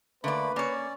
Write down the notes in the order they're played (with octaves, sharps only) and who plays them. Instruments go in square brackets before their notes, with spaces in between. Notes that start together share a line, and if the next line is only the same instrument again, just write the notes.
[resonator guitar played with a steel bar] D3 D5 [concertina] A3 A#3 B5 [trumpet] B4
[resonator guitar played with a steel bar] A#3 C#5 [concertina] C#4 D5